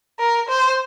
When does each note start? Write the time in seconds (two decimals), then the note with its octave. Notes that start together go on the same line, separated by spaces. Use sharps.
0.19 A#4
0.48 C5